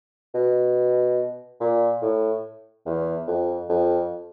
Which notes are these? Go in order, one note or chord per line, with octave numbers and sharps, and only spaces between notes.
B2
A#2
A2
E2
F2
F2